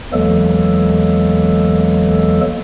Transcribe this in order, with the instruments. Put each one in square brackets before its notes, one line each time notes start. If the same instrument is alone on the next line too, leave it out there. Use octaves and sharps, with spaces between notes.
[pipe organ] E2 E3 F#3 G#3 A#3 A4